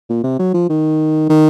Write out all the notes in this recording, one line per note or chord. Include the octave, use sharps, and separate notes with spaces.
A#2
C3
F#3
F3
D#3
D#3